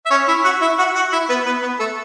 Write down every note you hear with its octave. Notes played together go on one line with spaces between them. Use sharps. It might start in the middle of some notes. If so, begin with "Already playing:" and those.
E5
C#4 C#5
E4 E5
F#4 F#5
E4 E5
F#4 F#5
F#4 F#5
E4 E5
B3 B4
B3 B4
B3 B4
A3 A4